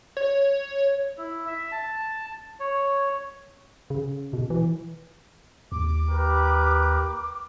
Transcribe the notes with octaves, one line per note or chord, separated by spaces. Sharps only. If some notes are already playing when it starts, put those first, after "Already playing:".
C#5
E4
E5
A5
C#5
C#3
B2
E3
D#2 D6
G4 A#4 B4